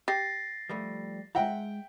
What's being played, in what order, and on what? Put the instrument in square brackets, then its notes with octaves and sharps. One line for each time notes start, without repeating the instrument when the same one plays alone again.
[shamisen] G4 [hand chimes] A6 A#6 C7
[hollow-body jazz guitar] F3 G3 A3
[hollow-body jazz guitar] G#3 A#5 [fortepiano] E5 F#5 G5